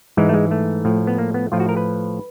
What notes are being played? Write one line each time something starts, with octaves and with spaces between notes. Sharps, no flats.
G#2 E3 G#3
A3
G#3
A3
A2 F3
B3
A#3
B3
A2 F3 F4
F#4
A#4
B4